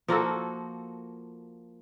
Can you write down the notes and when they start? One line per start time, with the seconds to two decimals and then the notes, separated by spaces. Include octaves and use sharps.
0.08 F3 A#3 F#4 A4